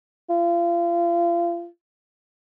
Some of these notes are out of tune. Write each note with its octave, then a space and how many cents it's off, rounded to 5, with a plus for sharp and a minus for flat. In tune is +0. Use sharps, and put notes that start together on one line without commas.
F4 -30